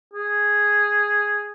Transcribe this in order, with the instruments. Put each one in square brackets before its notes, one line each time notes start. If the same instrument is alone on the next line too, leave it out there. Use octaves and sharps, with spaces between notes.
[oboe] G#4